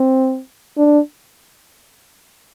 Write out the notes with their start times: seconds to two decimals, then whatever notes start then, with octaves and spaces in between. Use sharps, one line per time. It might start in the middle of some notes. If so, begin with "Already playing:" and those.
Already playing: C4
0.77 D4